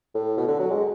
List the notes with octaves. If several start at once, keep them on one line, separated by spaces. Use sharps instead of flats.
A2
B2
D3
F#3
G#3